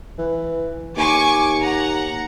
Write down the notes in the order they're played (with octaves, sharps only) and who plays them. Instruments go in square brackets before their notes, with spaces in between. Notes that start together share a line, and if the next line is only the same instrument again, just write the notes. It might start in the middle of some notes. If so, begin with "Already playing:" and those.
[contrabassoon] E3
[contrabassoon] D#2 [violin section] G#5 C#6 D6
[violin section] F#5 A#5